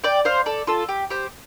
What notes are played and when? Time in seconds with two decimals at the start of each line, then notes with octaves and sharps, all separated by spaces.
0.04 D5 G5
0.25 C5 F5
0.46 A4 D5
0.67 F4 A4
0.89 G4
1.10 G4 C5